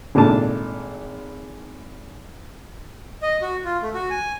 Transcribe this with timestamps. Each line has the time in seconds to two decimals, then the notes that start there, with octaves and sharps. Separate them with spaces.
0.15 G#1 A#2 A3 D4 A5
3.22 D#5
3.42 F#4
3.65 F4
3.82 A3
3.94 F#4
4.10 G#5